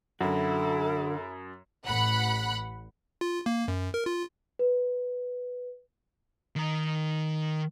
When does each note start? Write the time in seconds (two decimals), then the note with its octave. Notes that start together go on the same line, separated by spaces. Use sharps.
0.21 F#2 D3 E4 F#4 A4
1.86 A1 F#5 B5 F#6
3.21 F4
3.46 A#3
3.68 F#2
3.94 A#4
4.06 F4
4.59 B4
6.56 D#3 A#5